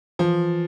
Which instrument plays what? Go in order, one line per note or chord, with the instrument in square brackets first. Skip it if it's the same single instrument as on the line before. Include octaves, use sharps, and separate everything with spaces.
[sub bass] E3 [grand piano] F3